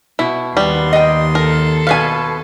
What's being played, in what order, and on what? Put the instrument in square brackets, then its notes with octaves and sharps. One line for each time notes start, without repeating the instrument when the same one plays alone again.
[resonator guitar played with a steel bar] B2 [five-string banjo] E4
[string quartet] D#2 C6 [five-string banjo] G3 B3
[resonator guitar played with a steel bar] D#5 G5
[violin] A4 [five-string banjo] A#4
[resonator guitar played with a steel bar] B2 B4 [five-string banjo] F5 G#5